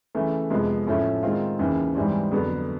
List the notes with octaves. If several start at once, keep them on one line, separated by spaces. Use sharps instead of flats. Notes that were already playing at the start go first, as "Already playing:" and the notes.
C#3 E3 A3
F2 C3 F3 G#3 B3
A2 F3 A3 C#4 E4
D#3 G#3 C4 F4
D#2 C#3 E3
G#2 E3 G3 C4
F2 D3 F#3 B3